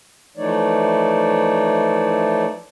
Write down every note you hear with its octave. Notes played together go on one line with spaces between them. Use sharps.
E3 F3 A3 D#4 C#5 D5